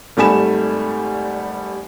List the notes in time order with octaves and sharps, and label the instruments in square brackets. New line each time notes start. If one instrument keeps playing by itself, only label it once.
[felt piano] G#1 G3 A3 G#5 B5 E7